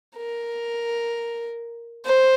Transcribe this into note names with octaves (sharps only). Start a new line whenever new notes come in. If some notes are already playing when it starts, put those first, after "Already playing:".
A#4
C5